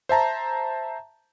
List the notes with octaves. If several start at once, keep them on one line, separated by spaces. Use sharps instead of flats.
C5 E5 A5 A#5